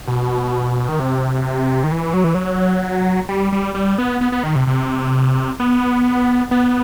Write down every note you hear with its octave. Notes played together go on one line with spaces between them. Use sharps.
B2
D#3
C3
D#3
E3
F#3
E3
F#3
G3
G3
G3
B3
B3
B3
D#3
C3
C3
B3
B3